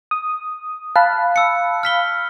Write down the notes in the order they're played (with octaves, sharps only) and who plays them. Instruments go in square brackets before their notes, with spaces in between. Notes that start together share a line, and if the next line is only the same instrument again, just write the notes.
[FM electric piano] D#6
[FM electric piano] F5 A5 B5 [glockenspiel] F#6
[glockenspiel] E6 C#7
F6 B6 G7